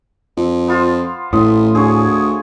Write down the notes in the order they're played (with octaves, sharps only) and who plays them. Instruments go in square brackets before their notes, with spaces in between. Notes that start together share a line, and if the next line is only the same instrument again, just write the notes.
[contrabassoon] F2
[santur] B3 F4 C5
[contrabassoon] A1 [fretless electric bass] A2 [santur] D#6
[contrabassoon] D2 [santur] G#4 C#5 G#5